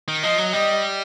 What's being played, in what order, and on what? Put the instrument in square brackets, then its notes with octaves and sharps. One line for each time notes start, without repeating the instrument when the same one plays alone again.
[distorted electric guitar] D#3
[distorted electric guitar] F3 [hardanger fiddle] D#5
[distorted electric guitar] F#3
[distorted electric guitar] G3 [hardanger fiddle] D#5